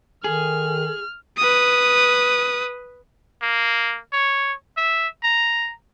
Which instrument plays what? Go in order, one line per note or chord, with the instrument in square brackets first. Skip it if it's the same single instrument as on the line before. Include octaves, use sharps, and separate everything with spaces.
[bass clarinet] D#3 [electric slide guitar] G#4 [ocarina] A4 [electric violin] F6
[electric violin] B4 D#6
[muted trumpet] A#3
C#5
E5
A#5